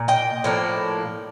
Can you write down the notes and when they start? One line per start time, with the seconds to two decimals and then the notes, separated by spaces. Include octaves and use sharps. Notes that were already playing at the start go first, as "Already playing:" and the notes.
Already playing: A#2
0.08 D#5 G5
0.44 A2 F3 A#3 D4